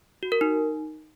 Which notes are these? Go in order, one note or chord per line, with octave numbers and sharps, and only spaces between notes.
F#4
A#4
D#4